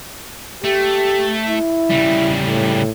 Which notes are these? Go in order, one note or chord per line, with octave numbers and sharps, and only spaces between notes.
A3 G4
E4
C#3 G3
A2